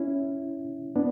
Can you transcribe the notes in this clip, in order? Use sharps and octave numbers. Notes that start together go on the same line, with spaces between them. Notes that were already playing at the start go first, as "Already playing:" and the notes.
Already playing: C#4 E4
B3 D4